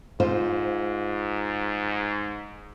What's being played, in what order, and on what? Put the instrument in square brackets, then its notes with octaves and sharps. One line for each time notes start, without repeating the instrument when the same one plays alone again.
[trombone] G#2 [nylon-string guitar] F4 C5